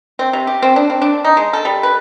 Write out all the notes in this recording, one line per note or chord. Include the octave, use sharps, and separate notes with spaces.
C4
C3
G4
C4
D4
C4
D4
D#4
G#3
A4
G3
B4